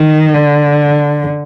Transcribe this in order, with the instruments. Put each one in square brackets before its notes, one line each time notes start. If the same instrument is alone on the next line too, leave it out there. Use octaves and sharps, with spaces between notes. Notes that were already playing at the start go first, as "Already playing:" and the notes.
Already playing: [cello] D#3
D3